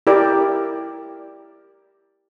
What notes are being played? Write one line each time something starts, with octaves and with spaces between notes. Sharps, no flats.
E4 G4 A#4 D5